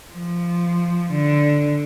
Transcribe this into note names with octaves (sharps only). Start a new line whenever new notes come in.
F3
D3